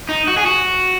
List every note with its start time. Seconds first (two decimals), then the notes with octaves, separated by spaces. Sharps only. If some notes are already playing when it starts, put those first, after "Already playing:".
0.09 D#4
0.28 F#4
0.37 G#4
0.46 F#4